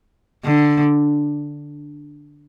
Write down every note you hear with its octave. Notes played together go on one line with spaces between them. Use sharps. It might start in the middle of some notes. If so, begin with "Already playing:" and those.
D3